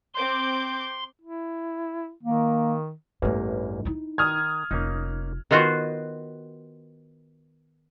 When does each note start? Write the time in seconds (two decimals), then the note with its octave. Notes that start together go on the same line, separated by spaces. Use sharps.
0.14 C4 C6 D6 G6
1.21 E4
2.23 D#3 A#3
3.22 A1 E2 G2 A3 A#3
3.85 D#4 E4
4.18 D#3 D#6 F6 G#6
4.71 F1 A#3 C#4 D#4
5.51 D#3 B3 F4 F#4 C5